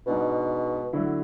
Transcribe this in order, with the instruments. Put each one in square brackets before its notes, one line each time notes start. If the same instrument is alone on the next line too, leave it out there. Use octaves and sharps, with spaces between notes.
[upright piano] G#2 G#3 D4 [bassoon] B2
[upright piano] D3 F#3 A3 E4